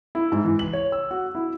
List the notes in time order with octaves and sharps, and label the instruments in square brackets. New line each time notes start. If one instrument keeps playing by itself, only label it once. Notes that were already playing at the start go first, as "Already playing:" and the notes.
[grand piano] E4
G#2
E3
F#7
C#5
E6
F#4
E4